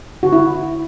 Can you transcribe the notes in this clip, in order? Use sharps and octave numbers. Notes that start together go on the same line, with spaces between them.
D3 F#4
E4